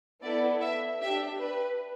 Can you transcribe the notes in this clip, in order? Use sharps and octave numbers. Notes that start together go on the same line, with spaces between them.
B3 E4 A4 D5
E5
D4 G4 E5
B4